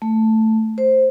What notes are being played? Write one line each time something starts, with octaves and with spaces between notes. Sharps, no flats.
A3
C5